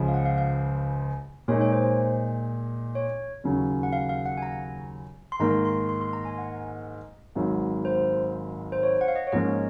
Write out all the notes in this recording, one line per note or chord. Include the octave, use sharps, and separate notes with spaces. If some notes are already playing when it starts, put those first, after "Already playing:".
Already playing: C#2 C#3 F3
F5
F#5
F5
F5
A#2 G#3 D#4 C#5
C#5
C5
C#5
D#2 C#3 F#3 C#4
F#5
F5
F5
F#5
G#5
A#5
C6
G#2 D#3 A#3 A#5
C6
C6
C6
A#5
G#5
F#5
G#1 G#2 F#3
C5
C5
C#5
F#5
F5
D#5
C#5
G#2 F3 A#3 C#4 D#5